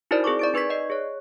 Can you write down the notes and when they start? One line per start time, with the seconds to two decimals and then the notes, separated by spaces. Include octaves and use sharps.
0.11 D#4 E4 F#4 A#4 C5 D5
0.24 C4 G#4 A#4 C#6 D6
0.39 D5 A6 D7
0.54 D#4 B4 C#6 G#6 B6
0.70 D5 D#5 C7
0.90 G#4 C#5